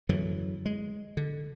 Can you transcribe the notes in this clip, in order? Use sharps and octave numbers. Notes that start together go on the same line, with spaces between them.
F#2 D3 E3 F#3
G#3
D3